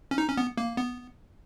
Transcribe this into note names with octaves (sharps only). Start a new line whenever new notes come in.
C#4
D#4
C#4
B3
A#3
B3